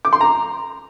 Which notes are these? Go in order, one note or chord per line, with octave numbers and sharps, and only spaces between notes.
D6
C6
A#5